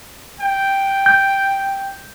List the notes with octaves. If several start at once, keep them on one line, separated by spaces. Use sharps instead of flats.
G5
G6